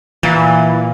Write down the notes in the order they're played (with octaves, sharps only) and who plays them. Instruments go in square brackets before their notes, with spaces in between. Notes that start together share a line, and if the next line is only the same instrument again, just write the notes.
[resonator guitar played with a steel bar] A#2 [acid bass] E3